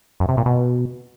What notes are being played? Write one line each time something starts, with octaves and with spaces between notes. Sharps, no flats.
F#2
C3
A#2
B2